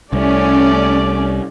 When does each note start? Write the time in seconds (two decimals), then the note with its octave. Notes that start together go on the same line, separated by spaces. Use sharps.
0.13 C2 A3 C#4 D5